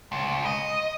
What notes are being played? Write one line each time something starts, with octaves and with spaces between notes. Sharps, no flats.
C#2
D#5